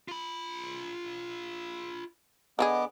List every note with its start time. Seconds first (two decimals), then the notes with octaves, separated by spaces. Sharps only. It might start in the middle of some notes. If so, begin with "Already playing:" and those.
0.08 F4 B5
2.59 D3 B3 F4 G#4 D#5 D6